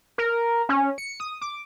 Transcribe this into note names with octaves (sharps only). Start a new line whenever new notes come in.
A#4
C#4
C#7
D#6
D6